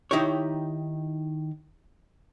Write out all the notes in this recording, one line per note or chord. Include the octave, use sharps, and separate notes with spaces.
D#3 D#4 E4 G4 C#5